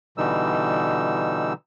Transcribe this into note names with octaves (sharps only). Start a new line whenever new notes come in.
B2 D3 E3 G3 D#4 E6